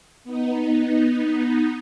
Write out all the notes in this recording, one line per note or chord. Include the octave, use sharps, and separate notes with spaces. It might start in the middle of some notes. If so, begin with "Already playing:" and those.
B3 D#4